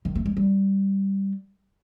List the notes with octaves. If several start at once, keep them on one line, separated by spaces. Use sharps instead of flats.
D#3
A3
G#3
G3